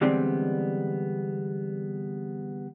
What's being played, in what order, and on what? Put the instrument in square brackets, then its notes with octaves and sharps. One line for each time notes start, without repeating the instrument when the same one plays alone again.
[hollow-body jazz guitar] D3 E3 G3 G#3 B3 C4